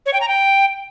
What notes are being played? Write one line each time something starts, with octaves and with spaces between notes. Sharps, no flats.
C#5
G5
A#5
G5